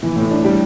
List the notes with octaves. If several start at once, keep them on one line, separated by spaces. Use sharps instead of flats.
E3
A2
D4
G3